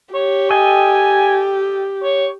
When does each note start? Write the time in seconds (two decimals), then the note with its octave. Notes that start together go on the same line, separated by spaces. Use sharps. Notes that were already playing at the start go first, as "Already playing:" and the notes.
0.14 G4 C#5
0.50 A4 D#5 G5 G#5
2.03 C#5